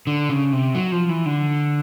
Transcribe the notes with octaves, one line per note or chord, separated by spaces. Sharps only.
D3
C#3
C3
F#3
F3
E3
D3